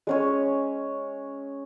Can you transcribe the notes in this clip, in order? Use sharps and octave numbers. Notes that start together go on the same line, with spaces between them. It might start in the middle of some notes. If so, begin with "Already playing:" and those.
G#3 C#4 C#5